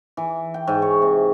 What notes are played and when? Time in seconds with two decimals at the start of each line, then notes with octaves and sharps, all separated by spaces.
0.17 E3
0.54 G5
0.67 G#2
0.82 C#5
1.02 C3